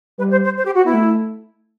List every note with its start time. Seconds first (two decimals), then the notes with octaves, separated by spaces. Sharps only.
0.18 G3 B4
0.31 C5
0.43 C5
0.57 C5
0.65 G4
0.75 F#4
0.84 B3 E4
0.94 A3